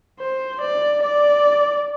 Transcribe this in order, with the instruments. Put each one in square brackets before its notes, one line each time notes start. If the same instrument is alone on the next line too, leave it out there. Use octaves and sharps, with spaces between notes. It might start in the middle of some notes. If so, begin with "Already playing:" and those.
[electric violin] C5
D5
D5